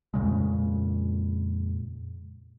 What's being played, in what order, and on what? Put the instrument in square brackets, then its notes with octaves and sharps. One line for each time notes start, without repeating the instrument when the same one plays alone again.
[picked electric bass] F2 A#2 C#3 G#3